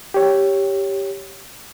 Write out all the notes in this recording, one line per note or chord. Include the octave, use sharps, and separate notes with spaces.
G4 C#5